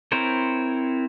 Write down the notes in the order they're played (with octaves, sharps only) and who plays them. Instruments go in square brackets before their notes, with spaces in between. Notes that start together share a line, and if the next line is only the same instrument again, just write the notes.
[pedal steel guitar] C4 E4 A#4 C5 C#5